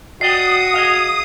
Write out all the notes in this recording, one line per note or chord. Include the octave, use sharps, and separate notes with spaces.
F#4 D5 D#5 G5 D#6 C7
G#4 D#5 F5